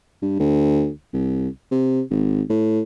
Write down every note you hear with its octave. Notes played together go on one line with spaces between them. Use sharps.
G2
D2
C2
C3
G#1
A2